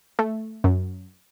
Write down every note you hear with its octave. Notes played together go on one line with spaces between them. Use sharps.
A3
F#2